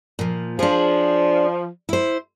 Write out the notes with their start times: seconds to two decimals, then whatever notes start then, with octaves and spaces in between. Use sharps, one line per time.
0.19 A#2 F3
0.59 F3 D4 G#4
1.89 E4 C5